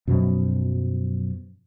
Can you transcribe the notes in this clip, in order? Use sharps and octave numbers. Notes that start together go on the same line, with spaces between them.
F#2 B2 F3 F#3